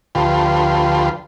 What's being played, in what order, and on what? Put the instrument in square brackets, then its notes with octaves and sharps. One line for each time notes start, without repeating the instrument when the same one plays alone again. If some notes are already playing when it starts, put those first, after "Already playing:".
[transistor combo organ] D2 F3 F4 G4 B4 C6